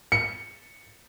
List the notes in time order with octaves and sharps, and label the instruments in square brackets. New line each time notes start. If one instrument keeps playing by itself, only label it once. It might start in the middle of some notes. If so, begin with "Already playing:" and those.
[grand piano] C#7